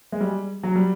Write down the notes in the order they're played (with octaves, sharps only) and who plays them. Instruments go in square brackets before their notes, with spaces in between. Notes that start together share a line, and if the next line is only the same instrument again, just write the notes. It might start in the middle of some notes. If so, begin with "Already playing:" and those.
[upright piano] G#3
G3
F#3
G3